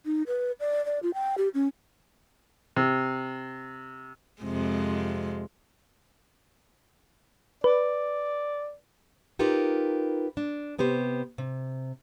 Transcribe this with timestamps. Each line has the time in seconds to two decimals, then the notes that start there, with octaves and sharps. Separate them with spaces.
0.06 D#4
0.27 B4
0.60 D5
0.85 D5
1.03 F4
1.14 G5
1.38 G4
1.54 C#4
2.76 C3
4.42 F2 C3 G#3
7.64 B4 D5
9.39 D#4 F4 G4 A#4 B4
10.37 D4
10.78 C3 B3 G4 C5
11.38 C3